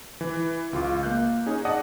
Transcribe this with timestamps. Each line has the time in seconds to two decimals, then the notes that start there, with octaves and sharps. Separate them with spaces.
0.21 E3
0.73 C#2 F4 D6
1.03 A#3 F5 F#6 G6
1.46 C#4 D#4 G#4
1.65 D5 D#5 F#5 A5 D#6